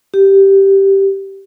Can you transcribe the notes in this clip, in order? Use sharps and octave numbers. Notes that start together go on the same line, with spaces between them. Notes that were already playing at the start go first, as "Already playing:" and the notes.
G4